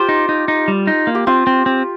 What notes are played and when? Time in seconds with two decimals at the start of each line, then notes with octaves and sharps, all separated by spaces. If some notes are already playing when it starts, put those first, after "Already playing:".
Already playing: F4 G4 C5
0.09 D#4
0.29 D#4
0.48 D#4
0.68 G3
0.87 D#4
1.07 A#3
1.15 G4
1.27 C4 F4
1.47 C4
1.66 C4